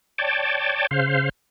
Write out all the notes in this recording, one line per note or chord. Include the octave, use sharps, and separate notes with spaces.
C#5 D5 G5 A5
C#3 C5 F5